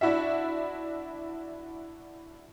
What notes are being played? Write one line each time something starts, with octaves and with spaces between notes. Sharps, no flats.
D4 E4 F#4 E5